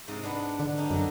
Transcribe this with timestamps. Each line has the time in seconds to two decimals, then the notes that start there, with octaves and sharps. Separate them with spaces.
0.08 G#2 C3 D#5
0.23 B3 D4
0.59 D3 D4
0.77 C#4 D#4 G4
0.90 F#2 D3 F#3